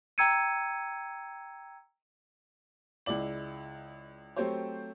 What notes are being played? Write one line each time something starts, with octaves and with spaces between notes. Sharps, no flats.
G5 A#5 E6 G#6 C#7 D#7
C#2 G#3 E4 D5 F#7
F#3 A3 C4 G4 C5 C#5